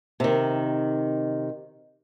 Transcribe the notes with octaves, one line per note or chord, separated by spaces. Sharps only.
C3 D#3